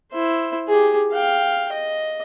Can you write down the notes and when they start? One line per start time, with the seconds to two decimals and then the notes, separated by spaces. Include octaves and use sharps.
0.13 E4 C5
0.68 G4 G#4
1.13 F5 G5
1.73 D#5